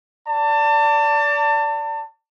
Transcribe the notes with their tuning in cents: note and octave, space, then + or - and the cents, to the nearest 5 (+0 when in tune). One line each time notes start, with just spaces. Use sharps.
D5 -25 A5 +30